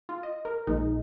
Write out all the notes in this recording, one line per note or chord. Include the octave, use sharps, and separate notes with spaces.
F4
D#5
A#4
A#1 A#2 F3 G#3 D#4